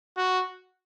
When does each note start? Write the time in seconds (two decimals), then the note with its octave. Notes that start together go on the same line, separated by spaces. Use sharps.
0.17 F#4